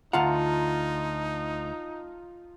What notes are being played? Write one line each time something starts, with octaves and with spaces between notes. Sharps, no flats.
D2 D#4 F4 F5 F#5 A5 A#5